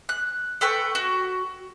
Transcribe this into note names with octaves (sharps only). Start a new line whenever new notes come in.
F#6
A4 B4 G5 C#6
F#4